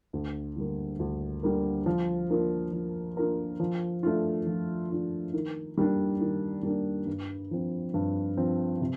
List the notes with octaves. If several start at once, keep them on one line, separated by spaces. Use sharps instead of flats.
D2
D3 G3 A#3
D2
D3 G3 A#3
F3
A#3 D4 F4 A#4
F3
A#3 D4 F4 A#4
F3
A3 D4 F4
F3
A3 D4 F4
D#3
G3 A#3 D4
D#3
G3 A#3 D4
G2
F3 C4
G2
F3 C4
C3